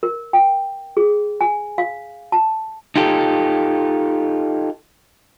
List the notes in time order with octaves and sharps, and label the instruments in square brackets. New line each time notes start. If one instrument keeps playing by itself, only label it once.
[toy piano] A#4
G5
G#4
G#5
F5
A5
[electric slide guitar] D#4 F4 G4 A4